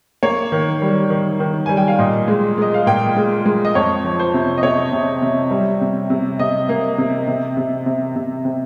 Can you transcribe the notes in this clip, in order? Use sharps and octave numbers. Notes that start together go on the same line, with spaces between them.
A#3 C#5
D#3
G3
D#3
D#3
G3 G#5
G5
F5
A#2 D#5
G#3
G#3 D#5
F5
A#2 G5
G#3
G#3
D#5
F2 C#5
F3
C5
C3
D#5
C3 C#5
C3
C3
G3
C3
C3
C3 D#5
A#3
C3
C3
C3
C3
C3
C3